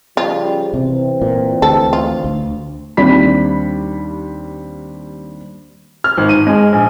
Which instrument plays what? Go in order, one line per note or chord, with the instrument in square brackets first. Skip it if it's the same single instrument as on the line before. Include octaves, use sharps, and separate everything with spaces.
[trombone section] C#3 F3 G3 [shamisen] F4
[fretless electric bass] C3 [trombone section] E3 C4
[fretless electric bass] A#2
[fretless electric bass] D2 [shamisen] A4
[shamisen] F4
[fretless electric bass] D2
[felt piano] D#2 G3 C4 D4 B5 B6
[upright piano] F6
G#1
D#7
G#3
A#1